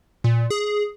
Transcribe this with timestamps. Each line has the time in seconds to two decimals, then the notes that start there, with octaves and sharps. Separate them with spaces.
0.24 A#2
0.50 G#4